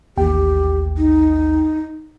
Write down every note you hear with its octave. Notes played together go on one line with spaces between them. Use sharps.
A1 D#2 G4 G5
D#4